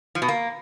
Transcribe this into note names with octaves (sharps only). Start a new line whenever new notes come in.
F3
B2
A#3